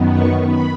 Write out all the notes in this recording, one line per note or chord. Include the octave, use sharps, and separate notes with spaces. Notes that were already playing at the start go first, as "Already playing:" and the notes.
Already playing: F#2 D#3 B3
C#6
B5